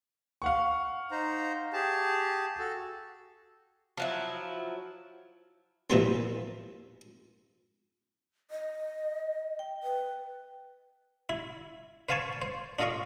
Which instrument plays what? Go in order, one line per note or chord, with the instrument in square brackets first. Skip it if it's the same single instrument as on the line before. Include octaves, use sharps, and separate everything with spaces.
[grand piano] F5 F#5 C#6
[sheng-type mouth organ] D#4 C5 A#5
G4 G#4 A5
F#4 A4
[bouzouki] F3 F#3 E4
[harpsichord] A#2 E3 F3 G3 B3 C4
[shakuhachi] D#5
[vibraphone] G5
[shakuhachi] B4
[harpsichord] E4
B4 C5 F5 G#5 A5 C#6
C5
D4 F4 A4 D#5 F5 C#6